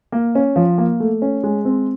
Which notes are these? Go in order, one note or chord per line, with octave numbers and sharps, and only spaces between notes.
A#3
C#4
F3
A#3
A3
C#4
G#3
C4